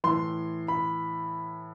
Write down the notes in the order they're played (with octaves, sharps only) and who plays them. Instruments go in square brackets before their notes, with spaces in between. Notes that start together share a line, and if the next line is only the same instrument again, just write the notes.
[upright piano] A2 E3 C6
B5